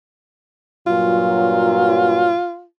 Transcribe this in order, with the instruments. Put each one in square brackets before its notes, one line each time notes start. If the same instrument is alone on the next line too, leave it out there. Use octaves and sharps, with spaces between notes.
[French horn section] G2 A#2 F#3 [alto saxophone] F4